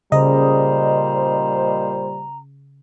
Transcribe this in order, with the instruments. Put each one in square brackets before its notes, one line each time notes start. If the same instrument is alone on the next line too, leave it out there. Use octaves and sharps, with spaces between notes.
[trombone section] A#2 G3 C5 [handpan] C#3 [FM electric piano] D#5 [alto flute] A#5